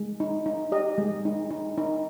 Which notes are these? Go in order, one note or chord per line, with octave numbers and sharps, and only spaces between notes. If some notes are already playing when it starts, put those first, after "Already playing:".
Already playing: G#3
D#4
D#4
G4 D#5
G#3
D#4
D#4
D#4